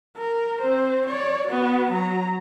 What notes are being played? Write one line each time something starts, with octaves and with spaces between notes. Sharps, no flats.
A#4
C4 C5
C#5 D5
B3 F#4
F#3 A#5